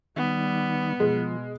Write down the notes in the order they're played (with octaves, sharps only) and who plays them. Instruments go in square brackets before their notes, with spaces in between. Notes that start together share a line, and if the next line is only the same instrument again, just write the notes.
[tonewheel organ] D#3 [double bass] G3 [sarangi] B3
[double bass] B2 [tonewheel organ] F3 [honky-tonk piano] G#3